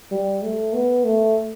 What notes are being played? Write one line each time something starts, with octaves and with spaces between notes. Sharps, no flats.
G3
A3
B3
A3